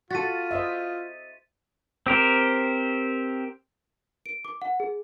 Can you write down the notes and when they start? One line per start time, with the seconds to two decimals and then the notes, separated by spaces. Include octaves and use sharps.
0.11 F4 F#4 A4 A6 B6 D#7
0.51 C5 D#5 E5
2.07 C4 G4 A#4 C5
4.26 D7
4.45 D6
4.62 F#5
4.80 G#4